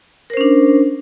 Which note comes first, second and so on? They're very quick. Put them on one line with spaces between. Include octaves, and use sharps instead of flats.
A#4 C5 C#4 D4